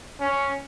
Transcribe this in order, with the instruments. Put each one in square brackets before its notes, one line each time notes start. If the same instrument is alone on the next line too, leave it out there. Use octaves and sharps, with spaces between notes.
[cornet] C#4